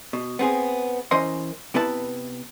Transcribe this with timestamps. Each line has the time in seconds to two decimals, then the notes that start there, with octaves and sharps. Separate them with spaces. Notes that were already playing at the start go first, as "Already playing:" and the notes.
0.13 B2
0.39 B3 C4 G#4
1.11 E3 C#4 A#4 C5 D#5 C6
1.74 C3 B3 E4 B4 A5